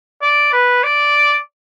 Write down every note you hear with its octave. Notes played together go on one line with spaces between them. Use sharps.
D5
B4
D5